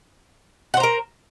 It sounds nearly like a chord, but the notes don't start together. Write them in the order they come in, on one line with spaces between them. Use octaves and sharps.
F#5 C5 A#5 A#4